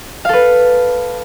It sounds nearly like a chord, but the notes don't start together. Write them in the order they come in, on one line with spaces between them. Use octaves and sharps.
F5 A4 B4